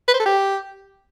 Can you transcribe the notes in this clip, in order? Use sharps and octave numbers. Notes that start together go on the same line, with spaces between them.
B4
C5
A4
G4